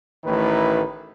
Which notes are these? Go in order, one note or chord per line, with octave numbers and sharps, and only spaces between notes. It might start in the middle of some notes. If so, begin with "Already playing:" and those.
A1 A2 D#3 E4 B4